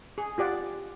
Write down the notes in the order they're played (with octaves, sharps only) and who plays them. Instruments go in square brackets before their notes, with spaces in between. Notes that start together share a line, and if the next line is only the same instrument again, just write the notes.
[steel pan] G#4
F4 G4 D5 F#5